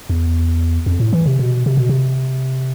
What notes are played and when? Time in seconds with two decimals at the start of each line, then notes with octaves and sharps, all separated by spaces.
0.10 E2
0.86 F2
1.00 A2
1.13 E3
1.26 C3
1.39 B2
1.66 C3
1.77 B2
1.89 C3